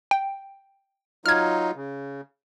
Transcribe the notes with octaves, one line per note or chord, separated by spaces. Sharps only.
G5
F#3 D#4 F4 F6 G#6
C#3